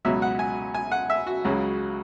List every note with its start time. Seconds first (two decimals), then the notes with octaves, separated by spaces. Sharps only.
0.05 C#2 B2 F#3 E5
0.22 F#5
0.39 G#5
0.74 G#5
0.91 F#5
1.10 E5
1.27 F#4
1.45 C#2 C#3 F#3